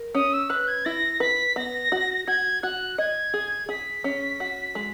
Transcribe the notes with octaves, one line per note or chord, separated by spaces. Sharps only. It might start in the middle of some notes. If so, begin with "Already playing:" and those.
Already playing: A#4
C#4 D#6
E6
B4 F#6
G#6
E4 A#6
B4 B6
B3 A#6
F#4
F#4 G#6
F#4 F#6
D#5 G#6
G#4
G#4 B6
C#4
F#4
G#3